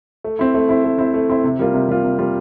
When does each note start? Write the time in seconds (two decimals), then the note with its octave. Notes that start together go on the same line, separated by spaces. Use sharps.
0.24 A3
0.39 C4 E4
0.54 A3
0.69 C4 E4
0.84 A3
0.98 C4 E4
1.14 A3
1.29 C4 E4
1.44 C3
1.59 G3 A#3 F4
1.74 C3
1.89 G3 A#3 F4
2.04 C3
2.19 G3 A#3 F4